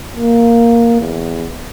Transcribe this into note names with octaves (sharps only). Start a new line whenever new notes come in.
A#3
E2